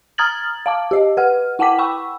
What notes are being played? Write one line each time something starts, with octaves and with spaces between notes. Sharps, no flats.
A#5 D#6 F6 G#6 A6 F#7
F5 A5 D6
G4 D#5
B4 F#5 F6
E4 F#5 G5 A5 D6 B6
G5 B5 C#6 E6